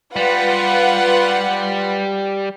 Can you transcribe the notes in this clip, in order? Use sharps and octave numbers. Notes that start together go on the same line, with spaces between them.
G3 F4 B4 F#5